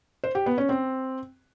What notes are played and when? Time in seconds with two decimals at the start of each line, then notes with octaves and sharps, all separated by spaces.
0.24 C5
0.35 G4
0.46 B3
0.58 C#4
0.69 C4